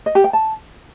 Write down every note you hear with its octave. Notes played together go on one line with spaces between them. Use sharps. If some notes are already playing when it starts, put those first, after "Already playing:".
D#5
G4
G5
A5